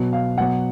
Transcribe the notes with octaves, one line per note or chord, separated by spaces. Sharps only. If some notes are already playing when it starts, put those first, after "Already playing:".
Already playing: B2 F#3
F5
B2 F#3 F#5